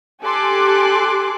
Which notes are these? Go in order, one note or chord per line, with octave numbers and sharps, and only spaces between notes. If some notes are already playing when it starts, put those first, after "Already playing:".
G4 A4 G#5 C6 D6 F#6